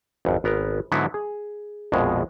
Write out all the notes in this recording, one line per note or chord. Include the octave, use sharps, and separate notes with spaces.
G#1 F2
G#1 B3 A#4
G#2 D3 F#3 B3 D#4 E4
G#4
A#1 F2 B2 G#3